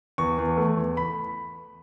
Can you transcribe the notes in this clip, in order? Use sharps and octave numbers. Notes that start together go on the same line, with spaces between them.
E2 C#6
E2
A3
E2
B5